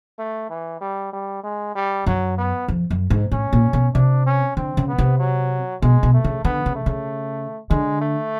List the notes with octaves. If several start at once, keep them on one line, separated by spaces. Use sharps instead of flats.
A3
E3
G3
G3
G#3
G3
F#2 F#3
B3
F2
F#2
G#2
A2 C#4
A#2
B2
C3 D4
C#4
D3 C4
C#3
B3
C3
F#3
B2 G#3
B2
A3
C#3
D3 B3
C#3
A3
C#3
D3 G#3
A3